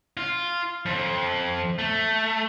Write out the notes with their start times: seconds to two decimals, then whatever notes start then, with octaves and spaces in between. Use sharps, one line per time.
0.17 F4
0.86 F2
1.79 A3